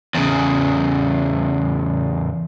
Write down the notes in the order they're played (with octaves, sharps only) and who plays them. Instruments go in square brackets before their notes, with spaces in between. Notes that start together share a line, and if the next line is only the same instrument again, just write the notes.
[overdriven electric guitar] E2 C#3